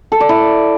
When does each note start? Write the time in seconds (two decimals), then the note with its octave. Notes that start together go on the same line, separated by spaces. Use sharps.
0.12 A4
0.20 D5
0.29 E4